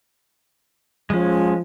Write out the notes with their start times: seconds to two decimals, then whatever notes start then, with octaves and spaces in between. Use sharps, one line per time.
1.10 F3 G#3 C#4